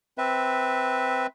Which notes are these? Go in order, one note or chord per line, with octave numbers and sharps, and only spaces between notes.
C4 B4 E5